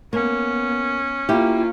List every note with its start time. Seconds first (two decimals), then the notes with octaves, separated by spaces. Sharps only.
0.13 A#3 B3 C#4
1.29 A#3 E4 F4 G4